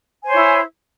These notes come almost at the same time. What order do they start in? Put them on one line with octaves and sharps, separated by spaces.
G#5 C5 C#5 E4